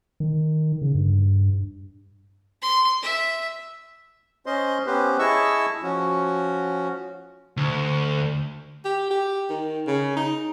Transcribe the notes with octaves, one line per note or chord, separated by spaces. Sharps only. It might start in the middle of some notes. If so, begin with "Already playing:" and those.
D#3
C#3
G2
C6
E5
C#4 C5 D#5 C6
B3 C#4 G4 B4 C5
E4 G#4 D#5 A5 C#6 E6
F3 C#4 F#4
D2
G4
G4
D#3
C#3
D#4